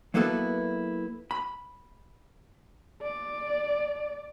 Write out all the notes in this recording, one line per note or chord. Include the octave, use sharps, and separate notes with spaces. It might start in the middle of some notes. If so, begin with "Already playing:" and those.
F#3 A#3 B3 E4 A4 B4
B5
D5